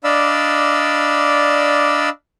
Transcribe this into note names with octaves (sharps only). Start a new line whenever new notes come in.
D4 D5 D#5 F5 B5 E6